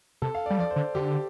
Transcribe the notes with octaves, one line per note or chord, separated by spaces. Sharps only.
C3 A4
F5
G3 D5
F3 D5
C5
D3
D3 G4